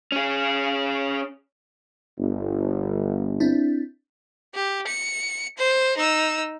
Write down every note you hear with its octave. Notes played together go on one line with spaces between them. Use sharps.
C#4 G#4
G1
C4 D4 E4
G4
C#7
C5
D#4 E6